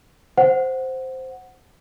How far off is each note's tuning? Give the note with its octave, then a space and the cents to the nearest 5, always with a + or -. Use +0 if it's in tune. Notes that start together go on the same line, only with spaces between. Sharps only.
C5 +0 F#5 +0